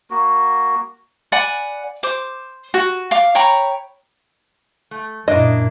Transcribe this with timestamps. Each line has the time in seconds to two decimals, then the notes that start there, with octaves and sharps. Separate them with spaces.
0.11 A#3 F#4
1.32 D5 F#5 G#5 B5
2.03 C5 D6
2.74 F#4
3.11 F5 D6
3.35 C#5 G5 A#5 B5
4.91 A3
5.28 F#2 A#2 A#3 D4 E4 D#5